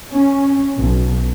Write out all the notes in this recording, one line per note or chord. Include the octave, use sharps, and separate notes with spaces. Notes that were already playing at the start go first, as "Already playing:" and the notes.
C#4
B1